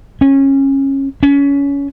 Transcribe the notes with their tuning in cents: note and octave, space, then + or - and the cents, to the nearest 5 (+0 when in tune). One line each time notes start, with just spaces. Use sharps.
C#4 -20
C#4 +25